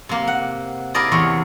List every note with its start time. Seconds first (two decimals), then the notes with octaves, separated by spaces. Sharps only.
0.09 C3 A#3
0.27 F#5
0.94 E4 G#4 A#4 D5 D#5
1.12 E2 C3 C#5